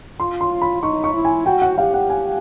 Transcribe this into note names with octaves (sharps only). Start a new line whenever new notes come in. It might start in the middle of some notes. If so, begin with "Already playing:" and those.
F4 C6
C6
B5
D#4 C#6
C#6
E4
G#5
F#4 G5
F#5
G4 F5
F#5
G#5